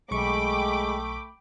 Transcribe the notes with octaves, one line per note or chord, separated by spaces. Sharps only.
B1 G#3 A3 G5 B5 C#6 D6